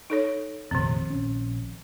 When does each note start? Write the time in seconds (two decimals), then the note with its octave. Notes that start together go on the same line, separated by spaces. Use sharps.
0.10 D#4 A4 C#5
0.71 F1 A#1 C3 D#3 C4
1.10 A#1 C#4